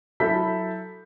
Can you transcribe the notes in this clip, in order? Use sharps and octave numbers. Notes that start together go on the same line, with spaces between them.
F#3 E4 A4 B5 G6 B6